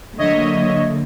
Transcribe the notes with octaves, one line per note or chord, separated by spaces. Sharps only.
D3 F#3 A#3 C#5 D#5 E5